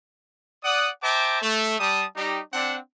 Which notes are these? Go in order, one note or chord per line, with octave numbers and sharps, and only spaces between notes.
D5 F#5 D#6
C5 E5 G5 A5 A#5 D6
A3
G3 A5 D#6
G3 D#4 G4
C4 D4 F#5